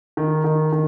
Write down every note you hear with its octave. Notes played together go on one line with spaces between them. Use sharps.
D#3
D#3
D#3